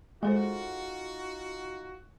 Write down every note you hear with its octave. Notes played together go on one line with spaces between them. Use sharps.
G#3 D#4 F4 F#4 G#4 A4 C5